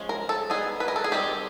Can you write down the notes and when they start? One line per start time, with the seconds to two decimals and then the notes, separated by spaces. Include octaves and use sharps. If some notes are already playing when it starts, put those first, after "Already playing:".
Already playing: F3 G#3 C#4
0.09 A#4
0.29 A4
0.50 G3 B3 D#4 G#4
0.80 B4
0.88 A#4
0.96 A4
1.04 G#4
1.12 D#3 G3 C4 D#4 G4